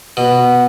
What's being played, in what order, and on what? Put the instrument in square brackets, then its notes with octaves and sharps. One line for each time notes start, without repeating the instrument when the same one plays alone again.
[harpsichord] B2